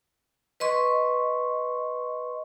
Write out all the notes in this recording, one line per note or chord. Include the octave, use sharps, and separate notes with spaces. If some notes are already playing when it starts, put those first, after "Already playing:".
B4 D#5 C6 C#6